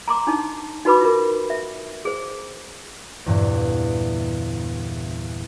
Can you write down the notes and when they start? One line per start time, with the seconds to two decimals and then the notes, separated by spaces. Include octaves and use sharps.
0.08 A#5 C6 D6
0.27 D4 D#4 A5
0.85 D#4 F#4 B4 B5 D6
1.00 F4 A#4
1.50 E5
2.05 G#4 C5
3.26 G1 E2 G2 A#2